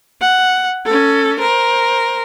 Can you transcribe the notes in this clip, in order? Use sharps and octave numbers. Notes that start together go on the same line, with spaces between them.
F#5
C#4 A4
A#4 C5